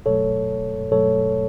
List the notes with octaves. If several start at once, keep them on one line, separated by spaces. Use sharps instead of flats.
B2 F#3 A3 A4 C#5
B2 F#3 A3 A4 C#5